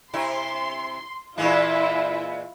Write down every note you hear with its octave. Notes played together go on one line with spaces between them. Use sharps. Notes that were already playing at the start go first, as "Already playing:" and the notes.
C3 E4 C6
A#2 E3 G#3 E4 F4